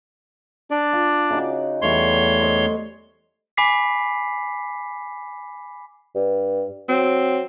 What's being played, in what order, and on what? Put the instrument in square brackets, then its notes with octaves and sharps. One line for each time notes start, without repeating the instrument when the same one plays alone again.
[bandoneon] D4 D5
[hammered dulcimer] F4
C#3 D#4 F#4
[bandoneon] E2 C#5 C6 [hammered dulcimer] G3 A3 D6
[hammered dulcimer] C5 D#5 G5
[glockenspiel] G#5 B5 D6 B6 C7
[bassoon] G2
[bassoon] F#3 [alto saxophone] C4